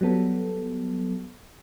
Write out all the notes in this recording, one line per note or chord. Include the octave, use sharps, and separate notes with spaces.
F#3 G3 B3 A4